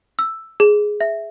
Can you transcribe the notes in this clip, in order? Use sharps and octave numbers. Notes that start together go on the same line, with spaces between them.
E6
G#4
E5